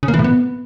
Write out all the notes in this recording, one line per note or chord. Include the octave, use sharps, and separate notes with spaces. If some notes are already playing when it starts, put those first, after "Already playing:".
C#3
A#3
E3
A2
B3